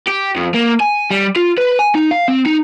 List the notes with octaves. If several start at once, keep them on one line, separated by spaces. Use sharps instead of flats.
G4
F2
A#3
G#5
G3
F4
B4
G#5
D#4
F5
C4
D#4